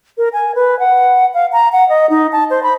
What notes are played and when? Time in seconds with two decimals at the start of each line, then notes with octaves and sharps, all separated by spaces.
0.18 A#4
0.33 G#5
0.55 B4
0.79 F#5
1.34 F5
1.53 A#5
1.72 F#5
1.89 D#5
2.10 D#4
2.32 A5
2.50 C5
2.63 B5